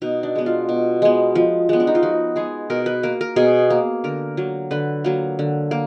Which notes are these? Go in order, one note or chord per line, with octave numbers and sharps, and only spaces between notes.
B2 D#4
D4
G#3 B3
F4
B2
G#3 B3
F3
G#3 B3
D4
D#4
F4
F3 F#4
G#3 B3 G#4
B2 A#4
B4
A#3 A#4
A#4
B2 G#4
A#3
D3 A#4
F#3 A#3
D3 B4
F#3 A#3
D3
A#3